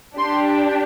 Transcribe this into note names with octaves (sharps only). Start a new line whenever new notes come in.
D4 G4 C6